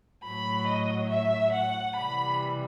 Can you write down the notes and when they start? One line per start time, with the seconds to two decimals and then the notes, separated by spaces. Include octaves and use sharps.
0.23 A2 F#3 B5
0.67 D#5
1.10 E5
1.53 F#5
1.96 C3 E3 G3 B5